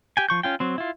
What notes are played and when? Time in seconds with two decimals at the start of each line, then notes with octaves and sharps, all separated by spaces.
0.17 G4 G5 G#5
0.29 F3 C#6 G6
0.43 C#4 F4 G5
0.60 F#3 C4
0.78 E4 F4